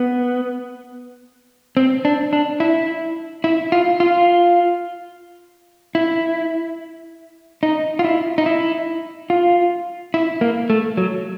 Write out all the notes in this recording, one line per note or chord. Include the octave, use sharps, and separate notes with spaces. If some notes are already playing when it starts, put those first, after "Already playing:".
Already playing: B3
C4
D4
D4
E4
E4
F4
F4
E4
D#4
F4
E4
D#4
E4
F4
E4
A#3
A3
F#3